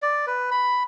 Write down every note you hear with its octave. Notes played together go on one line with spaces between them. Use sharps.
D5
B4
B5